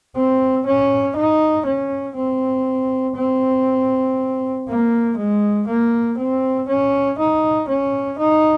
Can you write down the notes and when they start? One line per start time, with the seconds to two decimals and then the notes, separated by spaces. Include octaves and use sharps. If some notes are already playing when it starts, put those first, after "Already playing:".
0.16 C4
0.65 C#4
1.16 D#4
1.66 C#4
2.16 C4
3.16 C4
4.68 A#3
5.17 G#3
5.67 A#3
6.18 C4
6.68 C#4
7.18 D#4
7.68 C#4
8.18 D#4